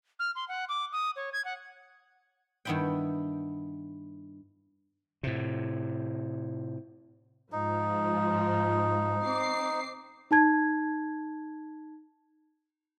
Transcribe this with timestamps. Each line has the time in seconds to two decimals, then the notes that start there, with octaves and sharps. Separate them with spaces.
0.19 F6
0.35 C6
0.48 F#5
0.69 D6
0.92 D#6
1.16 C#5
1.33 G#6
1.45 F#5
2.65 G2 D#3 B3 E4 E5 G5
5.23 A2 C3
7.52 G#2 F3 D#4
9.24 C4 D6 C7
10.31 D#4 A5 G#6